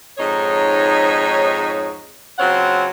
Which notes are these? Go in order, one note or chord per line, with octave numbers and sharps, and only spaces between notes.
F2 G#2 D#4 G#4 C#5
C#3 F#3 C4 F4 C#5 F#5